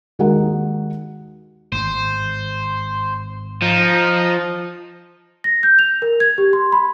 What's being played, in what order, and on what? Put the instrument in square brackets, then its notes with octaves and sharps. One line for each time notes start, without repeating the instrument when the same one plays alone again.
[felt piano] D#2 G#3 D#4 F#4 A#4 F#5
[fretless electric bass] G#1 [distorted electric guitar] C5
[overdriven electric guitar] F3 [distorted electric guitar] D#4
[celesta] A#6
G6
F7
A#4
G#6
G4
C6
B5